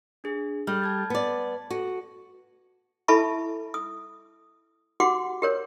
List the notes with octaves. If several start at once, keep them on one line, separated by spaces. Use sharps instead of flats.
D4 G#4
G3 A4 F6 G6
A5 G#6 A6
B3 D5
F#4 A4
E4 A4 E5 A5 B5 C#6
D#6
F#4 G4 F#5 C6 D6
G4 A#4 C#5